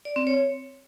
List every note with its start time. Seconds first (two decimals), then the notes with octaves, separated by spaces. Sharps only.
0.05 D5
0.16 C4
0.27 C#5